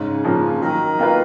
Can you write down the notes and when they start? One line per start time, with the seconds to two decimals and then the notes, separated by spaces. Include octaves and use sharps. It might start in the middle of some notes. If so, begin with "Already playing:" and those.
Already playing: G#2 C#3
0.25 F3 A#3 C#4
0.61 D#3 F#3
0.99 A#3 F4 B4